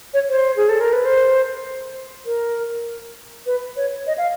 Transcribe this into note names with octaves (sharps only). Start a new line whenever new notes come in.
C#5
C5
G#4
A4
A#4
B4
C5
A#4
B4
C#5
D#5
F5